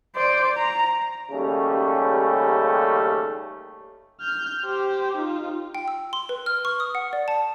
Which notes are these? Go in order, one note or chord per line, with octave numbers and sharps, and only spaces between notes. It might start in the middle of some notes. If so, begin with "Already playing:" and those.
C5 D5
A#5
D#2 C#3 G3 A3 C#4
F6 G6
G4 C5
D#4 F4
G5
E6
C6
B4
F6
C#6
D#6
F#5
D5
A5